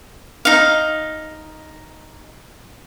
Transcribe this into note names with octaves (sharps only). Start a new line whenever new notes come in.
D#4 F5